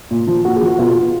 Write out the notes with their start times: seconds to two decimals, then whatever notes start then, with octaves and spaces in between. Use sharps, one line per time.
0.11 A#2
0.27 F3
0.45 A#2 F#4
0.56 G#4
0.62 F3
0.68 F#4
0.78 B2 F4